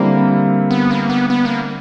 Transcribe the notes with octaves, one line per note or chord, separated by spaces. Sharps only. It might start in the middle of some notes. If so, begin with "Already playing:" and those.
Already playing: D3 G3 A#3 C4 E4
B3
A#3
B3
B3
A#3